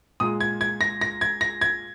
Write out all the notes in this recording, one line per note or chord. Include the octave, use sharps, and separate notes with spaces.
A#2 G#3 D#6
G#6
G#6
A#6
A#6
G#6
A#6
G#6